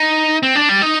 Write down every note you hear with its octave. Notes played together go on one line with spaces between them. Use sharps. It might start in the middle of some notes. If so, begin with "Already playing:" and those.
Already playing: D#4
C4
D4
G3
D#4